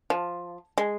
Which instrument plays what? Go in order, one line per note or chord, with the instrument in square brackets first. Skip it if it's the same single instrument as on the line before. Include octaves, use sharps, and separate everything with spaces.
[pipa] F3
G#3